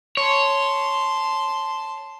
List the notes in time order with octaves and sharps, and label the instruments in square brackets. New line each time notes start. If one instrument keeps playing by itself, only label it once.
[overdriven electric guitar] C#5 [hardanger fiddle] A5 C6